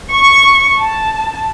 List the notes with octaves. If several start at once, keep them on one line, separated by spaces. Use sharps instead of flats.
C#6
A5